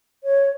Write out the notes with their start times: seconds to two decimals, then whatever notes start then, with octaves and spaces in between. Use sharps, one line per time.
0.24 C#5